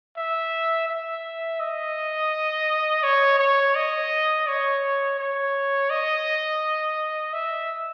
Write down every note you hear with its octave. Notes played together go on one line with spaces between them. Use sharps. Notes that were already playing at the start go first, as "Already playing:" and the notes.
E5
E5
D#5
C#5
C#5
D#5
C#5
C#5
D#5
E5